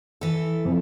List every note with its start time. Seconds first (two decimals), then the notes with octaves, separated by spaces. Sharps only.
0.21 E3 A4
0.65 F2